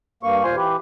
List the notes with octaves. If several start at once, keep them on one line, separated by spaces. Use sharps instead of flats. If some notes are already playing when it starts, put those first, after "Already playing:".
G2 A#3 C#6
D#2 A#2 F4 C5 G#5 C6
E3 G4 B4